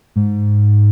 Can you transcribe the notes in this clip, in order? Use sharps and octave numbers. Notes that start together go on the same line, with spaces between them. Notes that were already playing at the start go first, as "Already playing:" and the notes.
G#2